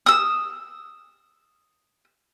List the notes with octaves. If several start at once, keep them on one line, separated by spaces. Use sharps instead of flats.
D#6 E6